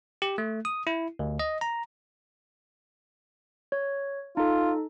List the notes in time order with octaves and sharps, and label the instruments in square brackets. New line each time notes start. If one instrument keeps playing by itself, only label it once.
[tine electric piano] G4
A3
D#6
E4
D2
D#5
A#5
[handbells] C#5
[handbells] D#4 A4 [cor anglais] F4